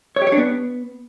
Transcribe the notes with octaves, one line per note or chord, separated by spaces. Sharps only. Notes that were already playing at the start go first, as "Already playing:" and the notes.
C#5
G4
C#5
D4
B3